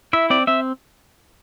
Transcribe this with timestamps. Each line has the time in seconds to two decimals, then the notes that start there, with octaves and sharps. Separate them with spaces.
0.13 E4 E5
0.30 C4 D5
0.47 C4 E5